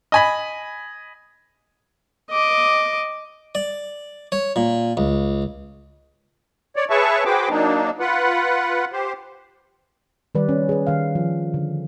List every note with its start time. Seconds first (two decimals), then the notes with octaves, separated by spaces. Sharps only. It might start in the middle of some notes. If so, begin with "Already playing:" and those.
0.12 D#5 G#5 B5
2.31 D#5 D6
3.55 D5
4.32 C#5
4.56 A#2
4.97 C#2
6.76 C#5 D5
6.90 G#4 B4 C#5 E5 A5 C#6
7.25 F#4 G#4 B4 C5 G5 D6
7.49 F#3 A#3 D4 D#4
8.00 F4 B4 F#5
8.92 G4 C5
10.35 D#3 G3 B4 D5
10.49 C#4
10.69 G#4 B4
10.87 D#3 F5
11.15 F3
11.54 D3